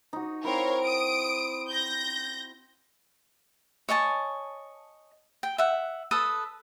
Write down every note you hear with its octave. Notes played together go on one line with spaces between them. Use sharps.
D#4 F#4
C4 E4 A#4 C#5 F5
D#6 D7
G6 A#6
C#5 D#5 G#5 A5
G5
E5 F#5
A4 B4 A5 D#6